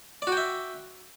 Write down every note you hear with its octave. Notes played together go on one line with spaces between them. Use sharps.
F#4 D5 E5 G5